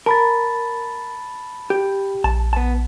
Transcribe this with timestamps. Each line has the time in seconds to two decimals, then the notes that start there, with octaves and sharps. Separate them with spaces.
0.06 A#4 A5 B5 A6
1.70 G4
2.24 A#1 A5
2.53 B3 A5